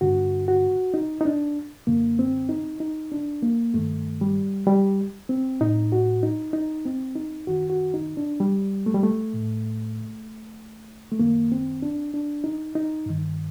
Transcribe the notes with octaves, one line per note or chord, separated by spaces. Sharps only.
G2 D3 F#4
F#4
D#4
D#4
D4
F#2 D3 A#3
C4
D#4
D#4
D4
A#3
G2 D#3 A3
G3
G3
C4
A2 D#4
F#4
D#4
D#4
C4
D#4
F#2 D#3 F#4
F#4
D#4
D4
G3
A3
G3
A3
A2
A3
F#2 D#3 A#3
C4
D4
D4
D#4
D#4
G2 D#3